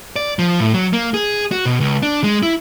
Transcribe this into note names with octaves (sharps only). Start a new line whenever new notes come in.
D5
F3
A2
F#3
A#3
G#4
F#4
B2
C#2
D4
G#3
E4